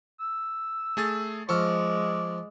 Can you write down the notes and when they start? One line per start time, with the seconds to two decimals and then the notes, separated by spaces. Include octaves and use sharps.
0.20 E6
0.97 A3 G#4 A6
1.49 F3 G#3 D5 C#6 E6 F6